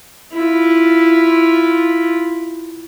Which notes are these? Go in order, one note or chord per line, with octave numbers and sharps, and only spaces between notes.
E4 F4